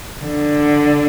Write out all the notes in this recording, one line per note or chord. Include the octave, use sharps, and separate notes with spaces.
D3